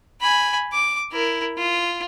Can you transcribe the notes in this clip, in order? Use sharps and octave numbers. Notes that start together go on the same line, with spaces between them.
G#5 B5
D6
E4 A#4
F4